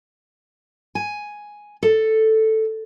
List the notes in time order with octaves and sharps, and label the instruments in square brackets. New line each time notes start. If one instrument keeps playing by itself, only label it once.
[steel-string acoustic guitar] G#5
A4